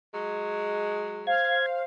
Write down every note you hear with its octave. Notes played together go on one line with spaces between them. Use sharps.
F#3 G#3
C5 F5 G#6